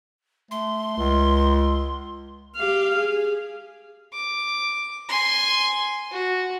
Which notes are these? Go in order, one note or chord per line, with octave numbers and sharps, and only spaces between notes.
A3 C6
C#2
G4 F5
G#4
D6
G#5 C6
F#4